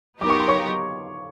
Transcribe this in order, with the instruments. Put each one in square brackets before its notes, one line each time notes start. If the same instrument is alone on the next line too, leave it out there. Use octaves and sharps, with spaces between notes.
[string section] F#3 B3 D#4 G4 A#4 [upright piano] D6
[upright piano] C#6
C6
C#5 C#6